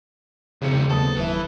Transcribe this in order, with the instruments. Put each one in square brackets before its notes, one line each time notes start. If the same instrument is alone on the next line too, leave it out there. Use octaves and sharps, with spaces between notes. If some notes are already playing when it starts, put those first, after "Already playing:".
[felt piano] E1 C4 C#7 [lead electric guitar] F2 G#2 [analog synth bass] C#3
[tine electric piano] D#2 F#3 [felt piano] B3 A5 D#6 [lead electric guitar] A4
[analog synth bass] F1 [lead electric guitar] E3 [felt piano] B4 E5